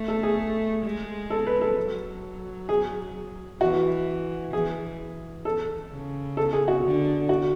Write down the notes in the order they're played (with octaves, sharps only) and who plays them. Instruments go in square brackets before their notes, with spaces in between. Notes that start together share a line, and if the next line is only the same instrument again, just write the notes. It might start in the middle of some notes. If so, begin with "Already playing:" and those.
Already playing: [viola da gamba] A3
[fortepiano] A4
G#4
[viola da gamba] G#3
[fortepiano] A4
B4
A4
[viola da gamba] F#3
[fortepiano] G#4
[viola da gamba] E3 [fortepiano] F#4
[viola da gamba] E3 [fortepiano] G#4
[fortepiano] A4
[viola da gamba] C#3
[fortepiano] A4
G#4
F#4
[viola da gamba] D3
[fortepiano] F#4